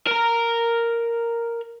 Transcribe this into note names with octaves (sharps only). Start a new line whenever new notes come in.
A#4 A#5